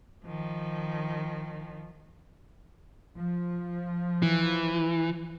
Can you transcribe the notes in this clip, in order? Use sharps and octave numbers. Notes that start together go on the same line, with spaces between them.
D#3 F3
F3
E3